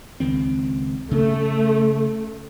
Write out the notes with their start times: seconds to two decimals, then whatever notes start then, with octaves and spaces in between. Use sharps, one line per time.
0.20 C#2 D#3 C4
1.11 C#3 A3